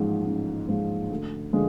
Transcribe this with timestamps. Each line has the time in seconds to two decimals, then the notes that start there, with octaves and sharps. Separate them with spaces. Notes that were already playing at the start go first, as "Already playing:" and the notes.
Already playing: A1 G#2 F3 G#3
0.25 A1
0.67 G#2 F3 G#3
1.10 D2
1.53 D3 F3 G#3